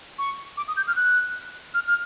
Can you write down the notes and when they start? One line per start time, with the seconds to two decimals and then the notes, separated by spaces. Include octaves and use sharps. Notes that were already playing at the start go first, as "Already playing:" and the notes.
0.18 C#6
0.57 D6
0.68 D#6
0.77 G6
0.87 F6
0.96 F#6
1.74 F6
1.87 F6